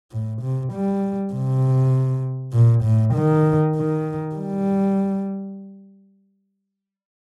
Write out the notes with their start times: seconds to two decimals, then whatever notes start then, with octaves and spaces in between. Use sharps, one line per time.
0.12 A2
0.42 C3
0.73 G3
1.34 C3
2.54 A#2
2.84 A2
3.14 D#3
3.76 D#3
4.35 G3